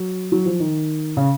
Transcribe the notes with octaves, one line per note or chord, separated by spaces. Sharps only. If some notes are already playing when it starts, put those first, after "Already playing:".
Already playing: F#3
F#3
F3
D#3
C#3